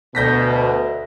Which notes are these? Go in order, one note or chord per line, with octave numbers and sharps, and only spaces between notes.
D2 B2 G6 A#6 B6